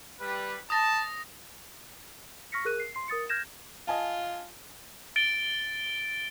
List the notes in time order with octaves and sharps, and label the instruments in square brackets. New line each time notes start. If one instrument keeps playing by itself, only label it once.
[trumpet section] G3 B4
[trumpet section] A5 [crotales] D#6 A#6
[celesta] C#6 F6 A#6 B6 C#7
G#4 A#4 F#6 D#7
C7
C6 C7
A#4 D#6 A6 C#7
F6 G6 G#6 A#6 E7
[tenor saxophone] F4 [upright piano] D#5 G#5 A5
[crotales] A6 D7 G7